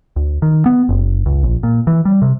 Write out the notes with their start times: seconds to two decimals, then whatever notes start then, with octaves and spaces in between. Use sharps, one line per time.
0.16 D2
0.42 D#3
0.66 B3
0.89 F#1
1.26 C#2
1.43 A#1
1.63 A#2
1.87 E3
2.05 G3
2.22 C3